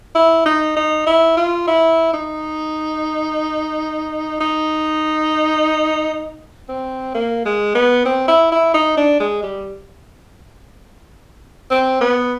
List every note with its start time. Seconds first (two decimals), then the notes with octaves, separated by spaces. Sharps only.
0.15 E4
0.46 D#4
0.77 D#4
1.07 E4
1.37 F4
1.68 E4
2.14 D#4
4.41 D#4
6.69 C4
7.15 A#3
7.45 G#3
7.75 B3
8.05 C4
8.28 E4
8.52 E4
8.75 D#4
8.97 D4
9.20 G#3
9.43 G3
11.71 C4
12.01 B3